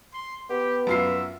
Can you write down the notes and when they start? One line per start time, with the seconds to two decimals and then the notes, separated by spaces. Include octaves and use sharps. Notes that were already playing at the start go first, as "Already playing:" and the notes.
0.13 C6
0.50 B3 G4
0.87 F#2 F4 E5 C7